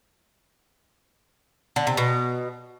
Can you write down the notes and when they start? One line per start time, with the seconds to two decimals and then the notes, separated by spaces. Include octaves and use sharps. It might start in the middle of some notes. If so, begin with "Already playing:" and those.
1.76 D3
1.87 C3
1.97 B2